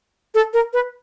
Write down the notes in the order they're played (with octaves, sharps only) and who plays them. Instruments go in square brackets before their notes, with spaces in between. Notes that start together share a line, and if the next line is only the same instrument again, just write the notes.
[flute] A4
A#4
B4